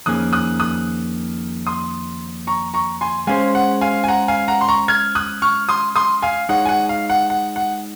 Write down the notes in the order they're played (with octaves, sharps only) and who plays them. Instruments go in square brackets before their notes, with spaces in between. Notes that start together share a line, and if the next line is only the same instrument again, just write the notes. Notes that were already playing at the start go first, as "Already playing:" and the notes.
[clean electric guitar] F2 D#3 A#3 C#4 G#4 [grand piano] D#6 F#6
[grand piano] D#6 F#6
D#6 F#6
C6 D#6
A#5 C#6
A#5 C#6
G#5 C6
[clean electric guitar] G#3 C#4 G#4 C5 [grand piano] F5 G#5
[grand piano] F#5
F5 G#5
G#5
F#5 A#5
F5 G#5
F#5 A#5
C6
A#5 C#6
F6 G#6
D#6 F#6
C#6 F6
C6 D#6
C6 D#6
F5 G#5
[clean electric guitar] G#3 D#4 G#4 C#5 [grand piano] F#5
[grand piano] G#5
F#5
F5
F#5
F#5
F#5